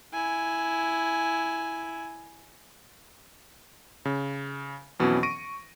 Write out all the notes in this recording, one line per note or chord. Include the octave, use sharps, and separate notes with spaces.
E4 G#5
C#3
F2 B2 E3 F#3 C#4
C#6 A#6 D7 D#7